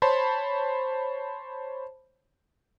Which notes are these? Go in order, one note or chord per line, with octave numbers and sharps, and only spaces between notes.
C5 C#5 A5 B5 C6